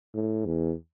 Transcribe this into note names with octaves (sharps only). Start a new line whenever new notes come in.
A2
E2